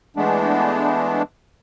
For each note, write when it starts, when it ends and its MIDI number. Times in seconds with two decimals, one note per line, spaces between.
0.16 1.22 52
0.16 1.22 56
0.16 1.22 57
0.16 1.22 59
0.16 1.22 62